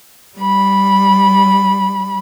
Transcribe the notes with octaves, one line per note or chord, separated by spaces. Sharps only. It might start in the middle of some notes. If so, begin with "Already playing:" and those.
G3 B5